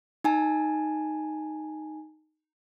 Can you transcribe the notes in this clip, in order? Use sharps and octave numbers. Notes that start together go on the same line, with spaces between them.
D#4 G#5 A5